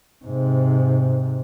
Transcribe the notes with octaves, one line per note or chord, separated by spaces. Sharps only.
G#2 C3